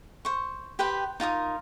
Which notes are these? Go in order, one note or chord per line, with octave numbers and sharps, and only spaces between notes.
C5 C#6
G4 B4 C5 G5
D#4 F4 A#4 D#6